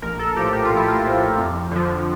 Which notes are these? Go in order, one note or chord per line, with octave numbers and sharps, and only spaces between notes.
A#1 A#4
A4
A2 F3 G4
G4
F4
A#1
E4
F4
A2 F3
F2
D3 F3